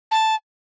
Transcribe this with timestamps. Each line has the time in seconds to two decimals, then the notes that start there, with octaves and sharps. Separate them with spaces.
0.11 A5